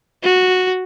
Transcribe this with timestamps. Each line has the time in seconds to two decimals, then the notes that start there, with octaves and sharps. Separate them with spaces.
0.23 F#4